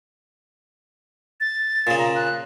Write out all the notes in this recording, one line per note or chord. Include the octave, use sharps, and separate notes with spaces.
A6
A#2 C#3
A#5
F#6